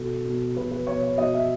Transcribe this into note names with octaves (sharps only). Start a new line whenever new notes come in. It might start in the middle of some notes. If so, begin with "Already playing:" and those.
Already playing: B2 A4
B2
B2 B4
B4
B2 C#5
C#5
B2 D#5
E5